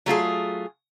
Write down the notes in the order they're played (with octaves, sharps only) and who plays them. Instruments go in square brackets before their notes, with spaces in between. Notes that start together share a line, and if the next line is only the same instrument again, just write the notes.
[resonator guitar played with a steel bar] F#3 A3 F4 G#4